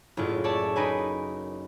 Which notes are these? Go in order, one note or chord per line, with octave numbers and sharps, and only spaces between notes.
F#1 A2 E4 F4
C#5 D5 E5 A5
D#4 A#4 B4 G#5